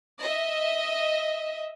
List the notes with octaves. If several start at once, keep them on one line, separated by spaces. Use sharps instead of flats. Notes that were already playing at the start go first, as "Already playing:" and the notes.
D#5 E5